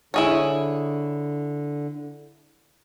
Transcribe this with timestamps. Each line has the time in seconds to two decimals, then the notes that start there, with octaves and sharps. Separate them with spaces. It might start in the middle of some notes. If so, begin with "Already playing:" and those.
0.14 D3 E4 G#4 C#5